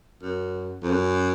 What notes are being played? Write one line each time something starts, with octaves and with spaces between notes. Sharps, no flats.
F#2
F2
F#2